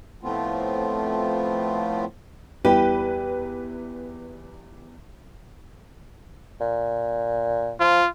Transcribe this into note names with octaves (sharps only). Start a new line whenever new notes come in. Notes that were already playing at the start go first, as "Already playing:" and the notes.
A2 F3 A3 B3 C4 F4
E2 G3 E4 G4 B4
A#2
F3 F4